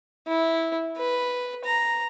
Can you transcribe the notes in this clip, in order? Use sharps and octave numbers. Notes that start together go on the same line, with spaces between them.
E4
B4
A#5